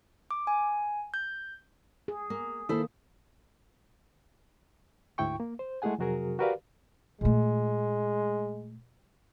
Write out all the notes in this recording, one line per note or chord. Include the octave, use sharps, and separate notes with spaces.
D6
G#5
G6
G#4
A#3
D#3 A#3 E4 A4 C5
D2 G#2 E4 G5 C#6
A#3
C5
G#3 A3 E4 G#4 F#5 G#5
F2 C3 F#3 F#4 G#4 A#4
F#4 G4 A#4 B4 D5 F5
A#2 G#3 A3